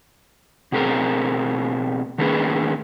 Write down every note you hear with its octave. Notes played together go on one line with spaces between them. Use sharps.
B2 A3 C4 G#4 A#4
D#3 A3 A#3 C#4 G#4 B4